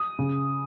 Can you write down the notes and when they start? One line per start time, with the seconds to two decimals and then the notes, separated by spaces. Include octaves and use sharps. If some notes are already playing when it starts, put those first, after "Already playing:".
Already playing: D#6
0.19 C#3